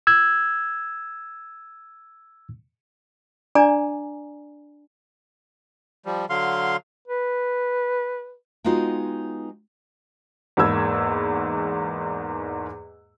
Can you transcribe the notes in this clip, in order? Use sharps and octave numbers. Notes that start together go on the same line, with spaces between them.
E6 G#6
D4 D5 G#5 A#5 D6
F3 G3
D3 F#3 F5 C6
B4
G#3 B3 D#4 F4 F#4 G5
E2 G#2 A#3 B5 E6 G#6